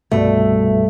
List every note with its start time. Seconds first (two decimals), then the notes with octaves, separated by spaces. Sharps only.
0.12 C2 G2 B2 A3 E5